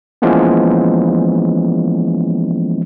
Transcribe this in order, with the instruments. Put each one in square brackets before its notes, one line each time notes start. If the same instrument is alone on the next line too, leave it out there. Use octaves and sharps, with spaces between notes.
[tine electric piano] E3 F3 G#3 A#3 B3 C#4